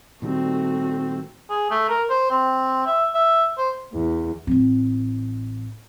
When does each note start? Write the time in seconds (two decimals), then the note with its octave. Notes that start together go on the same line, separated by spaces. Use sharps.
0.22 A#2 D#3 G3 A3 C4 F#4
1.49 G#4
1.70 A3
1.89 A#4
2.10 C5
2.31 C4
2.86 E5
3.15 E5
3.58 C5
3.94 E2
4.47 A1 C4